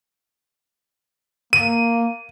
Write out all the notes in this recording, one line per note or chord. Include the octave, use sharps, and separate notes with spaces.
A#3 D#7